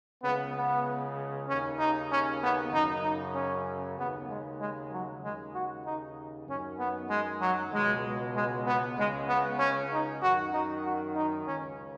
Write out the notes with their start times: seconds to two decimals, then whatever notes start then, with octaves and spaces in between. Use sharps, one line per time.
0.24 C#2 C#3 B3
0.55 B3
1.48 D#2 C#3 C#4
1.79 D#4
2.11 C#4
2.41 B3
2.72 F#2 C#3 D#4
3.04 D#4
3.35 C#4
3.98 D#2 C#3 B3
4.29 G#3
4.60 G#3
4.92 F#3
5.22 D#2 C#3 G#3
5.54 F#4
5.85 D#4
6.47 F#2 D#3 C#4
6.78 B3
7.09 G#3
7.41 F#3
7.72 C#2 B2 G#3
8.35 G#3
8.66 B3
8.97 C#2 C#3 G#3
9.27 B3
9.59 C#4
9.91 D#4
10.22 F#2 D#3 F#4
10.52 D#4
10.84 F#4
11.16 D#4
11.46 C#2 C#3 C#4